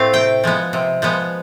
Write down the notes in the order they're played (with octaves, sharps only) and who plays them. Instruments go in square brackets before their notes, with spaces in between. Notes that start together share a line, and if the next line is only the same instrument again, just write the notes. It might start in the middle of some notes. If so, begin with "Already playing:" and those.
Already playing: [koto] A2 A3 C4 F5
C3 G5
F3 G#3 B3
C3
F3 G#3 B3